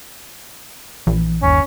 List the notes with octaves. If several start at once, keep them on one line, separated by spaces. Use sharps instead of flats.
A#1 E3
G1 D#2 C#4